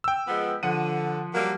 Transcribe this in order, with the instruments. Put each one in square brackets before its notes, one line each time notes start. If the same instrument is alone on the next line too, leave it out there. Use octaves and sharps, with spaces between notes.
[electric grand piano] G5 E6
[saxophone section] F3 G#3 B3
[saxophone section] D3 [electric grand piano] F3 F#5 D#7
[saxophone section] F#3 G3 A#3